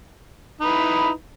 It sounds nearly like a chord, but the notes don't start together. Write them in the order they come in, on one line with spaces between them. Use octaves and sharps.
D#4 B4 E4